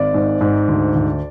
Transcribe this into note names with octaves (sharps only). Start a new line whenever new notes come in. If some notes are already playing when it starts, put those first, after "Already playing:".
Already playing: G#1 D5
G#2
G#2
D2
D2